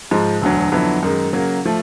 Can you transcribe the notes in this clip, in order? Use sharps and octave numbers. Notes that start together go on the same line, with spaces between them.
G#2 F3 G#3
E1 D2 D3 F#3
F2 D3 F#3 B3 E4
F#2 D#3 G#3
C#3 F#3 A#3
F3 A3